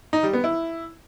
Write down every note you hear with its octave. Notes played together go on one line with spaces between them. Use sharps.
D#4
G3
B3
E4